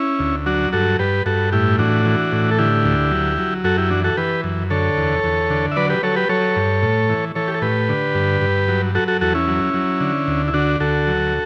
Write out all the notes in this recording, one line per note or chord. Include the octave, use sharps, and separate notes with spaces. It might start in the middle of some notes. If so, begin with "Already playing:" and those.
Already playing: C#4 E4
D2
F#3 D4 F#4
G2 F#4 A4
G2 G4 B4
G2 F#4 A4
A2 E4 G4
E3 D4 F#4
E3
A2
A4
D3 E4 G4
D2
F#3
F#3
F#2 F#4 A4
E4 G4
E3 D4 F#4
F#4 A4
E3 G4 B4
F#2
D3 A4 C#5
E2
E2
D3
E5
F#3 B4 D5
G4 B4
F#3 A4 C#5
G4 B4
F#3 A4 C#5
G2
A2
E3
E3 A4 C#5
G4
A4
A2 G4 B4
D3
G2
G2
F#3
F#3 F#4 A4
F#4 A4
E2 F#4 A4
C#4 E4
F#3
F#3
D3
D2
E4
D3 D4 F#4
D2 F#4 A4
F#3